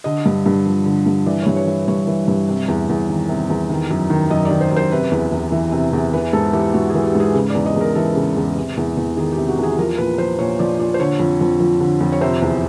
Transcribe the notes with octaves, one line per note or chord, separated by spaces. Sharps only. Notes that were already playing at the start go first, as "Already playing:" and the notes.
D3 D#5
G2
G2
F3
D3
G2
E3 D5
C#5
G2
C#5
E3
G2 C#5
E3
G2
C3
E2
E2
D#3
C3
E2
D#3
F#2
D#3
F#2 D#5
D5
D#3
C5
F#2 C5
C3 B4
E2
E2
E3
C3
E2
E3 B4
G#2 A4
E3 G4
G#2 F#4
G#4
E3
G4
G#2 G#4
C#3 B4
D5
E2
D#5
E2 A#4
E3 A4
C#3
E2
C3
E2
E2
D#3 G#4
G4
C3
F#4
E2 G#4
F3 A#4
A#2 B4
F3 C5
A#2 C#5
F3 D5
A#2 D5
C5
D3 C#5
F2
F2
F3
D3
F2
C#5
C3 C5
E2